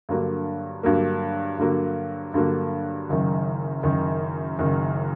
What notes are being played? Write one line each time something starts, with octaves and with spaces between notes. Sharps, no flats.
G2 D3 F#3 A#3
G2 D3 F#3 A#3
G2 D3 F#3 A#3
G2 D3 F#3 A#3
F#1 F#2 D#3
F#1 F#2 D#3
F#1 F#2 D#3